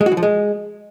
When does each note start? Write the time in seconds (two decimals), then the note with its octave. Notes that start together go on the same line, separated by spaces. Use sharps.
0.01 G#3
0.06 F#4
0.12 E3
0.17 F3
0.23 G#3